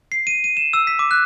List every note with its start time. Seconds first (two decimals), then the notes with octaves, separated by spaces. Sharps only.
0.12 C7
0.27 D#7
0.44 D#7
0.57 E7
0.73 E6
0.87 B6
0.99 D6
1.11 F#6